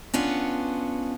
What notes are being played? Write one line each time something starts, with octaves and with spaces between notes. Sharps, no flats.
B3 C#4 D4 F4